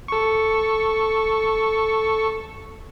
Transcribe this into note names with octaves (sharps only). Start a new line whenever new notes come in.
A4 C#6